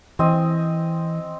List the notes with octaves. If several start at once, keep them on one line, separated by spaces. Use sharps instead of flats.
E3 C4 D#5 G#5